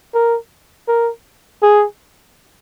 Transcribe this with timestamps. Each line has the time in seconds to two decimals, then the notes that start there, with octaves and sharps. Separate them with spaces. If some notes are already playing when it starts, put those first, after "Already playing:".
0.14 A#4
0.88 A#4
1.63 G#4